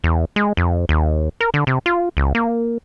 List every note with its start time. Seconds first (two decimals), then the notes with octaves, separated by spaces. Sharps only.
0.04 E2
0.36 G#3
0.57 F2
0.89 D#2
1.41 A#4
1.54 D3
1.67 C3
1.86 F4
2.17 C#2
2.35 A#3